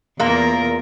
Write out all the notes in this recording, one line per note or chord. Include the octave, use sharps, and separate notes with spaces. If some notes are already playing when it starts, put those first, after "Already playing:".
E2 A#2 A#3 A#4